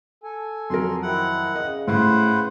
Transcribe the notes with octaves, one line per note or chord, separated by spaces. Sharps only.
A4 G#5
F2 F#3 A#4 C6
D#3 C4 E4 F#5
C#3 D#5
A2 E4 B4 C5 F#5 C6